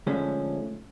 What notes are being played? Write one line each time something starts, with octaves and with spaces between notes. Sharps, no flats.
D3 F3 G#3 A3 C#4